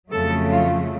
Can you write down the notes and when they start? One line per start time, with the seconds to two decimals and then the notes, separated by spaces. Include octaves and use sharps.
0.11 F2 C#3 F#3 A3 A4
0.52 F4